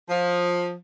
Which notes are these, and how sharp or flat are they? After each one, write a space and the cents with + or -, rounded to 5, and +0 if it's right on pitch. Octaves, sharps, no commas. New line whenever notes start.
F3 +15